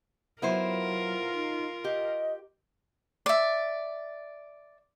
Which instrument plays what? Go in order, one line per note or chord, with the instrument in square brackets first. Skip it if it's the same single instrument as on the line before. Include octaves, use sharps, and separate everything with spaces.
[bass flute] F#3 [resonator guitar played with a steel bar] B3 E4 C5 [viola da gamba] F4 A#4
[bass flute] D#4
[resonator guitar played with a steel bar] G4 [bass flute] D#5
[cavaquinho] D5 E5